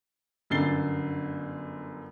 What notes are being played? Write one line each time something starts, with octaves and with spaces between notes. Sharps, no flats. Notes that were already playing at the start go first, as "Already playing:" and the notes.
G1 F#2 D3 A6 C7 G7